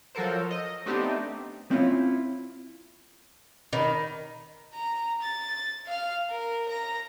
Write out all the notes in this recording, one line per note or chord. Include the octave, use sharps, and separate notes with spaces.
F3 F#3 F#4 A4 A#4 C5
D#5
A3 B3 C4 D4 D#4 G4
C4 C#4 E4 F4
D#3 B5
A#5
A6
F5 F6
A#4
A#5 A#6